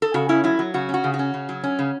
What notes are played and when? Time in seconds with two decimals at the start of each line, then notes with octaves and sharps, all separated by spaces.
0.02 A4
0.14 C#3 F#4
0.29 C#4 E4
0.44 F#3 E4
0.59 F#3
0.74 C#3 F#4
0.89 C#4 F#4
1.04 C#3
1.14 F#4
1.19 C#4
1.34 C#3
1.49 F#3
1.64 C#4
1.79 C#3